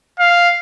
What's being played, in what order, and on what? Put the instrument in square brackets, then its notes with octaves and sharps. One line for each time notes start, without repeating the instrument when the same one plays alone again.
[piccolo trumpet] F5